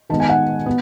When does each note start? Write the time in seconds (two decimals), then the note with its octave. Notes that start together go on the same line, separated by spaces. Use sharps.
0.09 D#3 G#3 B3 A5
0.20 G#5
0.29 F#5
0.66 B3